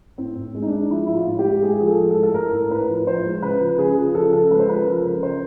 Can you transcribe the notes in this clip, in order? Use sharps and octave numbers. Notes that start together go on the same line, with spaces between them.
A2 C4
A2
G#3
D#4
D4
G#3
F3 E4
A2 E4
F4
A2
G4
G#3
G#3 G#4
F3 G#4
A4
G#3
A4
A2
A4
A2 A#4
A2
A2 B4
F3
F3 C5
G#3
C#3 B4
F3
C#3 G#4
F3 G#4
F3 A4
C#3 A4
G#3 B4
C5
F3 B4
F3 A#4
C#3
C#3 C5